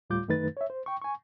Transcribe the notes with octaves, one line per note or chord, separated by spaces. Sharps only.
D2 A2 G3 F4 D6 G6
F#2 D#3 A3 D#4 B4 A6
C#5 E5
C5
G5 C#6
G#5 C#6